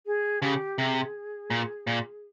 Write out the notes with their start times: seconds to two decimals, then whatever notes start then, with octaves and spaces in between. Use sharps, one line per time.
0.06 G#4
0.41 C#3 G4
0.78 C3 G#4
1.50 A#2
1.87 A#2